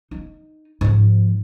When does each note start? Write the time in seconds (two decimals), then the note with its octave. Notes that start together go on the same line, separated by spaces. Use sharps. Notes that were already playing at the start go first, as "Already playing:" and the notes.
0.11 D#4
0.81 G#2 F3